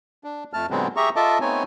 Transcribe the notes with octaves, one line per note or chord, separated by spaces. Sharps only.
D4
F2 A3 A5 F6
A#2 D3 F#3 G#3 B3 C4
G4 G#4 E5 A#5 C#6
F4 A4 D#5 E5 A5 D6
A3 B3 C4 D#4 C#5 G#5